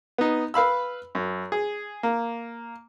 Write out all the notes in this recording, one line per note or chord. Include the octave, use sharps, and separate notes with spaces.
B3 D#4
B4 F5 B5 E6
F#2
G#4
A#3